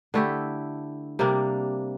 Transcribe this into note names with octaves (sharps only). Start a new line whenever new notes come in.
D3 A3 E4 G4
C3 G3 A#3 D4